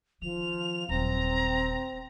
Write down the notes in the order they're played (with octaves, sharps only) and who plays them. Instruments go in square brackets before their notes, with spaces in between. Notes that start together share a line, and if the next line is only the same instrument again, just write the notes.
[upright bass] D#3 [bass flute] F3 [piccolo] F7
[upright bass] D#1 F#3 [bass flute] C4 [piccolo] A#5